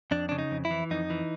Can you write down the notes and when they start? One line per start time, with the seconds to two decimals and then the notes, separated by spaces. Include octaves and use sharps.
0.11 F2 D4
0.29 C#3 D4
0.38 D#4
0.51 F2
0.65 E4
0.71 E3
0.91 F2 D#4
1.10 E3